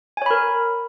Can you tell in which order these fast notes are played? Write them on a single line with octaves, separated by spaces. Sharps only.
G#5 C#5 B5 A#4